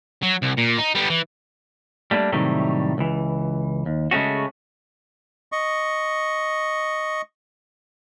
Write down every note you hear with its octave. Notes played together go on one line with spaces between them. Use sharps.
F#3
C2
A#2
D#4
G3 B3
E3
G3 A3 A#3 C4 D4
A2 C3 D#3 F#3 G3 A3
C#2 E3
D#2
C#3 G#3 A3 C#4 F#4
D#5 C#6